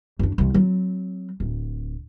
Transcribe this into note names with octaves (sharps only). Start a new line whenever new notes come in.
F#2 D4
C2 E3
F#3 C4
D1